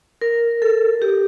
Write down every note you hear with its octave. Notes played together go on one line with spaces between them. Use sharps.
A#4
A4
G4